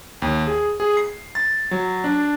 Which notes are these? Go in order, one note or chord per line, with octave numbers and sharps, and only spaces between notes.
D#2
G#4
G#4
C7
A6
F#3
D4